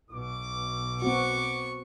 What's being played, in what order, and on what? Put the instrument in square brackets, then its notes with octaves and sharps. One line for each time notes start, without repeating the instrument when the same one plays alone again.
[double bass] B1 B2 [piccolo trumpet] D6
[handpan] B3 C4 F#4 [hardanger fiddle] C#6